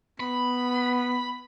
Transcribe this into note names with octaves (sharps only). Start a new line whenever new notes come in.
B3 B5